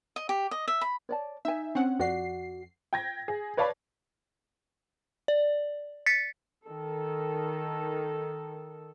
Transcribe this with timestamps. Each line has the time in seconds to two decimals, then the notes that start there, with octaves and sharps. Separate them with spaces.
0.16 D#5
0.29 G4
0.51 D#5
0.68 E5
0.81 B5
1.09 C#5 D5 A5
1.45 D#4 E5 G#5
1.75 C4 C#4 F#5
1.99 F2 F#4 D5 F#5 C7
2.93 G5 G#6 A#6
3.28 G#4
3.57 B4 C#5 D5 F5 A5 B5
5.28 D5
6.06 A6 B6 C#7
6.66 D#3 A4